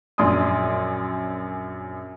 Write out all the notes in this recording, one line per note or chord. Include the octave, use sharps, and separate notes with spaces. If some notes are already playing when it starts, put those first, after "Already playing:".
A#1 F#2 D5 G#5 C6 D#6